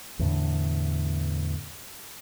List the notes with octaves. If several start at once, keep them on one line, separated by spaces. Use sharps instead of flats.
E2 A2 D3